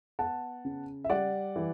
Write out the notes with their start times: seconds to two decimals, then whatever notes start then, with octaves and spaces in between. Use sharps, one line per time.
0.19 B3 F#5 A5
0.65 C#3
1.04 E5
1.10 G3 D5 F#5
1.56 E3